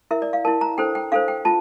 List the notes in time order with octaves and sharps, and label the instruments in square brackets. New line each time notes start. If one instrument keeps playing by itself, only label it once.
[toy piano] E4 A#4 E5
D5
F5
E4 A#4 A5
A#5
D4 A4 C5 G5
G5
D4 A4 C5 F5
G5
F4 A5